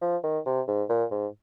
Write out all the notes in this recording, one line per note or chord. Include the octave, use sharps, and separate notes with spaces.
F3
D#3
C3
G#2
A#2
G#2